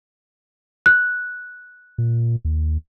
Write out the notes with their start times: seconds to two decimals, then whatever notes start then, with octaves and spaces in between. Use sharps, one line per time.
0.86 F#6
1.98 A#2
2.45 D#2